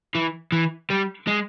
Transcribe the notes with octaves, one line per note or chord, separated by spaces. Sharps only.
E3
E3
G3
G#3